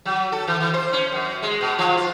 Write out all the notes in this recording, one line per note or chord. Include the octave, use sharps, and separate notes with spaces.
F#3
A4
E3
E3
C5
C#4
F#2
G#3
B2
F3
F4